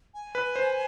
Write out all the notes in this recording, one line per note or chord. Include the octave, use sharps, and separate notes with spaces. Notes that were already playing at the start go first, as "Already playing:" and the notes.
G#5
B4
C5